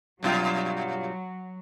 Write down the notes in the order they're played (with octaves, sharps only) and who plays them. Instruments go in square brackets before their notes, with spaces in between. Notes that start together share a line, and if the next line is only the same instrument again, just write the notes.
[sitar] G2 B2 F4 [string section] F#3